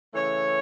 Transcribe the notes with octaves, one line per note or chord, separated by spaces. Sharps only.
C#3 E3 A3 C#5